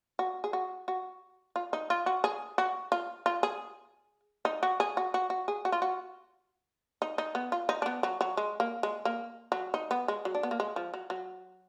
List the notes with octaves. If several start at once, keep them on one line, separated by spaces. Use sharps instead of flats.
F#4
G#4
F#4
F#4
F4
D#4
F4
F#4
G#4
F#4
F4
F4
G#4
D#4
F#4
G#4
F#4
F#4
F#4
G#4
F#4
F4
F#4
D#4
D#4
B3
F4
D#4
D4
B3
F#3
F#3
G#3
A#3
G#3
A#3
F#3
D#4
B3
G#3
F#3
D4
B3
A#3
G#3
F3
F#3
F#3